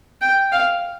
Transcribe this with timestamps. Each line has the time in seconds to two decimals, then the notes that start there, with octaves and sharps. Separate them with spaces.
0.21 G5
0.52 F5